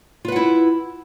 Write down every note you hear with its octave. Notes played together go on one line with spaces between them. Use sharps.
E4 F4 B4 F#5